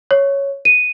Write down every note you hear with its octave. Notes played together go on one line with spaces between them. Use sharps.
C#5
D#7